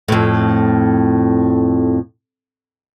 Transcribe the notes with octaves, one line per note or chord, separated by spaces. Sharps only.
F2 A2